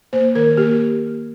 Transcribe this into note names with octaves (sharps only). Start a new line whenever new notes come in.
A#3 C5
D#3 A#4
A#3 G4